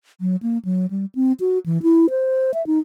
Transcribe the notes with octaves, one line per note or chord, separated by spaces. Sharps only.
F#3
A#3
F#3
G3
C4
F#4
E3
E4
C5
E5
D#4